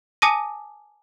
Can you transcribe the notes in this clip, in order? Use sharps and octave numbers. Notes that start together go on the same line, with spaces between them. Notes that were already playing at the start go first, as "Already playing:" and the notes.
G#5 A5 D6 D#6 A#6 D#7